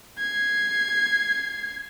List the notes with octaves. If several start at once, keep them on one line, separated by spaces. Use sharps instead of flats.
G#6 C7